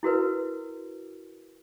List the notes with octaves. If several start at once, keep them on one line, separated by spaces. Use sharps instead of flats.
E4 F#4 A#4 B4